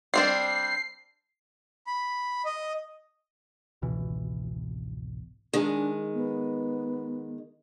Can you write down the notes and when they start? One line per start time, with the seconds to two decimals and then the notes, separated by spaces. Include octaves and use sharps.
0.14 G3 C4 D4 C7
1.87 B5
2.45 D#5
3.82 G#1 C#2 B2 E3
5.53 D#3 G#3 D4
6.14 B3